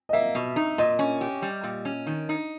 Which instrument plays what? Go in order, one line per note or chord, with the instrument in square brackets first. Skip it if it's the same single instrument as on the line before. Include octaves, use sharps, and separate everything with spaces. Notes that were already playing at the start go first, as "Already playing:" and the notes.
[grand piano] D#5
[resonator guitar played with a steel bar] A#3 [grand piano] E5
[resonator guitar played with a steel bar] B2
D#4
[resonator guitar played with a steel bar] A#2 [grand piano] D#5
[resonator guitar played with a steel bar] C#4
G4
G3
A#2
C#4
D#3
D#4